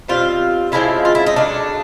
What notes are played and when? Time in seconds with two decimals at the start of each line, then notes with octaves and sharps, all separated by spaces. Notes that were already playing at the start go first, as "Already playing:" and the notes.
0.08 B2 G3 C4 F4
0.72 C#3 F3 G#3 C4 E4
1.05 F4
1.15 E4
1.27 D#4
1.36 C#3 F#3 A3 D4